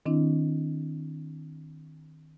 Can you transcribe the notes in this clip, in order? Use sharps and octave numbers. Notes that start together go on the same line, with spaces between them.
D#3 C4 D4 E4